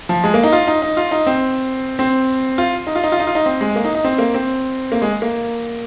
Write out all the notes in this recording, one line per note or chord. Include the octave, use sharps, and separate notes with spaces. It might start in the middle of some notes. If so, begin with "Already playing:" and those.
F3
G#3
A#3
D#4
F4
D#4
D#4
F4
D#4
C4
C4
F4
D#4
F4
D#4
F4
D#4
F4
D#4
C4
G#3
A#3
D#4
D#4
C4
A#3
C4
A#3
G#3
A#3